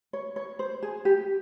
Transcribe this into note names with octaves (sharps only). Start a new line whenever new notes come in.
C#5
C#5
C5
G#4
G4